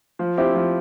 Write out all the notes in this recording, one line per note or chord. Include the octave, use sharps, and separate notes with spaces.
F3
C4 E4 G4
F3